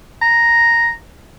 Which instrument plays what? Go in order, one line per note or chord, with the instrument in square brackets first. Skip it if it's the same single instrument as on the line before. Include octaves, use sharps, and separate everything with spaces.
[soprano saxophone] A#5